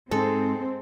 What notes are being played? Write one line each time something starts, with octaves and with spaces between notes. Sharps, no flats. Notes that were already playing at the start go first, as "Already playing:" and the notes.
G#2 G#3 C4 A4